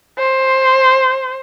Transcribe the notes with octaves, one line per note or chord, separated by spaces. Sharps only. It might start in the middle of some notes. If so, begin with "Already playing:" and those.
C5